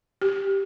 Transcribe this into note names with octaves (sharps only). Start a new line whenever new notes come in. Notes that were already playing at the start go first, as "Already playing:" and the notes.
G4